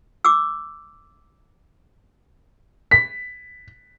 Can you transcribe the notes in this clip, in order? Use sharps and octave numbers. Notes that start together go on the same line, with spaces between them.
D6 E6
B6